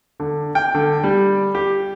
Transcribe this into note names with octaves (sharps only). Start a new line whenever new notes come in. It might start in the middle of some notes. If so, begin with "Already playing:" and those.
D3
G5
D3
G3
G4